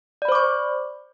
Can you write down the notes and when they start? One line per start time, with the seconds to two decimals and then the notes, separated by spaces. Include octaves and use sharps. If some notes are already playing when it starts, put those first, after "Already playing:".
0.22 D5
0.25 B5
0.29 C5
0.32 D6
0.35 C#6